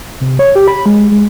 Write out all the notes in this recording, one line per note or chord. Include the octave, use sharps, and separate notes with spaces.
C3
C#5
G4
B5
G#3
G#3